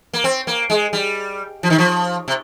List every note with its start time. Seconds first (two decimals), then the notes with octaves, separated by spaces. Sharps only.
0.13 A#3
0.24 C4
0.47 A#3
0.70 G#3
0.93 G3
1.63 F3
1.70 D#3
1.78 F3
2.28 C3